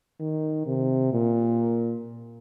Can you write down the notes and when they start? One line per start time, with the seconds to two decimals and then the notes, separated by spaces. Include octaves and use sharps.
0.20 D#3
0.66 C3
1.12 A#2